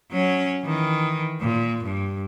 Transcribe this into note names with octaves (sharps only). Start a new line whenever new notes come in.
F#3 C#4
D#3 E3
A#2
G2